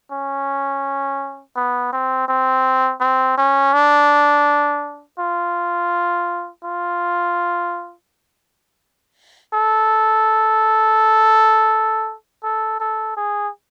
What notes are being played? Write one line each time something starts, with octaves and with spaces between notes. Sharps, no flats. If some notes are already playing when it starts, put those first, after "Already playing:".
C#4
B3
C4
C4
C4
C#4
D4
F4
F4
A4
A4
A4
G#4